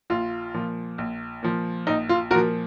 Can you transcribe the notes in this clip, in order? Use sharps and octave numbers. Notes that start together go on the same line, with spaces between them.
A#1 F4
A#2 F3
A#1
A#2 F3
A#1 D#4
F4
A#2 F3 F#4 A#4